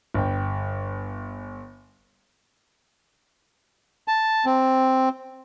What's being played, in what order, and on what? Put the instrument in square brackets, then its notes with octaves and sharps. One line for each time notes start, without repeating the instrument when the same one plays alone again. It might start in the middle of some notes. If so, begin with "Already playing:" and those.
[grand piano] G1 G5
[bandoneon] A5
C4